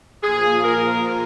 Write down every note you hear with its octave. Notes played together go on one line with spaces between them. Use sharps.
A#2 F3 A#3 F4 G#4
A#4